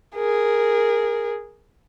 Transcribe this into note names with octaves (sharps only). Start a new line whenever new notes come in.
G#4 A#4